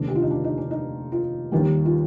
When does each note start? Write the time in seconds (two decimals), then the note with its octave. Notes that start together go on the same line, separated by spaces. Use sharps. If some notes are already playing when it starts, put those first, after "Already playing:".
Already playing: F1 D#2 D3 D4
0.08 G4
0.15 F4
0.22 D#4
0.31 D4
0.44 D#4
0.57 D4
0.71 D#4
1.12 F4
1.52 D#2 D#3 G3
1.85 F4